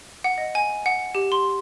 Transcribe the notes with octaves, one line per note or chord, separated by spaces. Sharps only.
F#5
D#5
G#5
F#5
G4
C6